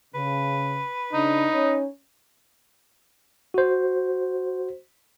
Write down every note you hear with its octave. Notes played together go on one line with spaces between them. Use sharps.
C#3 B4
C#3 D4 D#4
C#4 C#5
F#4 C5